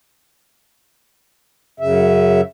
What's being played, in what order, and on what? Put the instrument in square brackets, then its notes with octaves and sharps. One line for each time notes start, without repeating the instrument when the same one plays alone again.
[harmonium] F#2 C#3 E5